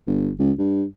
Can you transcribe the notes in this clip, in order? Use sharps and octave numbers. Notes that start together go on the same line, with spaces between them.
G1
C#2
G2